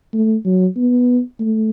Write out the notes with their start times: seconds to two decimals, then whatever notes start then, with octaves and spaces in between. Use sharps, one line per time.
0.13 A3
0.45 F#3
0.76 B3
1.40 A3